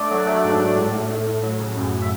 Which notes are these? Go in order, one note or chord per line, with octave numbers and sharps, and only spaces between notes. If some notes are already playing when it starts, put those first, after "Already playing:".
Already playing: A3 D4 D5
F#3
A3
G#2
A3
A2
A2
A2
A2
F#3
C#3
F#2
E5